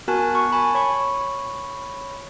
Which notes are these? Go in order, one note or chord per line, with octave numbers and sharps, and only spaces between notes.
B3 F#4 A#4 G#5 A5 F#6
C#6
G#5 A5 B5
C#5 B5 C#6